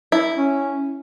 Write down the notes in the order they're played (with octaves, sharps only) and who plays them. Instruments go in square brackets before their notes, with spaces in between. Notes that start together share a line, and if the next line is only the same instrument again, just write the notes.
[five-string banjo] E4
[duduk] C#4